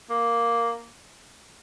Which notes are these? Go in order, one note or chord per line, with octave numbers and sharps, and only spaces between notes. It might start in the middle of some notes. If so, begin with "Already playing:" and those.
A#3